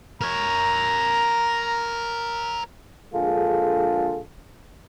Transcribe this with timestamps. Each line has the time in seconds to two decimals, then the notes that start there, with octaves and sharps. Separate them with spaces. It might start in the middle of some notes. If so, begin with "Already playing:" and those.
0.21 A#4 C#5 A#5
3.13 A#1 D3 G#3 F4 G#4 A4